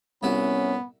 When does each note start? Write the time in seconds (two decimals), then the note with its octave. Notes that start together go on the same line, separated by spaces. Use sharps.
0.23 C2 B3 C#4 E4 F#4